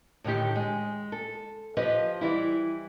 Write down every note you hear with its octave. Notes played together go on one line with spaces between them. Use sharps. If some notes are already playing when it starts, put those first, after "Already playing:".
A2 D3 D#3 G4
G#3
A4
F3 G4 B4 D#5
E3 G3 E4